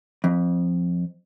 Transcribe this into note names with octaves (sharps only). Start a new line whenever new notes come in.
F2